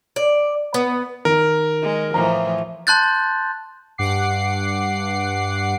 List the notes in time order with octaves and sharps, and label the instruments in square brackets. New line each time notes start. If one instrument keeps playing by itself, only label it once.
[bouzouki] D5
B3
[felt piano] D#3 [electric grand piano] A#4
[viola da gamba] G#3
[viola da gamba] A2 E3 F3 [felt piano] A#5
[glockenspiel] A5 C6 F#6 G6 A6
[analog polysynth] G2 F#5 D6 C7